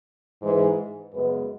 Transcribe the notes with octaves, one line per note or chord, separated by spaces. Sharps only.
G#2 E3 G#3
F#2 C#3 G#3 B3 B4